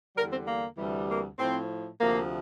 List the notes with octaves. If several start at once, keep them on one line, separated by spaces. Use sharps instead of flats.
E2 D3 G3 A#4
C4
A#3
D2 C3 E3 G3
A#3
A2 F3 C4
D2 C3 F3 A#3